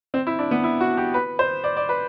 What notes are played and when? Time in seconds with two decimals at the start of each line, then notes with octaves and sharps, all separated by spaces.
0.14 C4
0.27 E4
0.39 D4
0.51 B3
0.64 E4
0.80 F#4
0.97 G4
1.14 B4
1.39 C5
1.64 D5
1.77 D5
1.89 B4